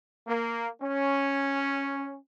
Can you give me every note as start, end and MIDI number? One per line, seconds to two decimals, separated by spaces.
0.26 0.67 58
0.81 2.15 61